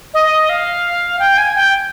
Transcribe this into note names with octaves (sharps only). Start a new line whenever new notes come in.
D#5
F5
G5
G#5
G5